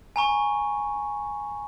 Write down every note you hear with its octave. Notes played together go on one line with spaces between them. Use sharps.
G#5 A#5 C#6